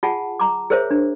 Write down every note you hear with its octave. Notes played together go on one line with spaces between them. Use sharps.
F4 G#4 F#5 G#5 A5
A#5 D6
G#4 A#4 C5 C#5 E5
D4